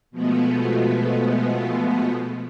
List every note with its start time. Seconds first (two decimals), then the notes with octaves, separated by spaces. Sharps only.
0.11 B2 F3 G#3 A3 B3